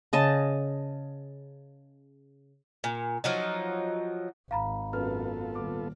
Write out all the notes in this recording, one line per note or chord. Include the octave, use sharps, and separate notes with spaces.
C#3 D#5 A5
A#2
F3 F#3 D#4
G#1 F5 A#5 B5
F#2 B3 F4 A4 B4 F6
D#1 D6